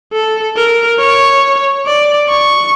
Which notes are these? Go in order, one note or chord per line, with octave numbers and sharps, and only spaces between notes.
A4
A#4
C#5
D5
C#6